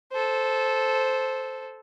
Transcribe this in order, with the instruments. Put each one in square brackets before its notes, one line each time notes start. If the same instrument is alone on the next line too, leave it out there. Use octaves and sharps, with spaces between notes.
[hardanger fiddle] A4 C5